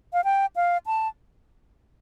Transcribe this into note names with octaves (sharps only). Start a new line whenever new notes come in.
F5
G5
F5
A5